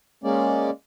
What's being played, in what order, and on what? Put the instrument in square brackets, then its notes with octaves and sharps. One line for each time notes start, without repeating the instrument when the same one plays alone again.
[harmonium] G#3 A#3 C#4 D5